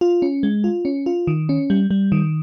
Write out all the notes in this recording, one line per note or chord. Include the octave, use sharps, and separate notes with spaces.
F4
C#4
G#3
F4
C#4
F4
D#3
C#4
G3
G3
D#3